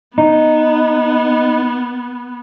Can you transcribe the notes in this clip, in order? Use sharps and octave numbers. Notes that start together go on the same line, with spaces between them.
B3 D#4